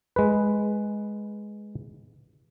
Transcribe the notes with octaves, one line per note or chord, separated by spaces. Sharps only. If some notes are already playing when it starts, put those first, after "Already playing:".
G#3 B4